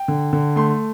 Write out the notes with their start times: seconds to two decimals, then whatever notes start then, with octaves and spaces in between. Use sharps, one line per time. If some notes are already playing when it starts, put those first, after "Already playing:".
Already playing: G5
0.08 D3
0.33 D3
0.56 A3 C6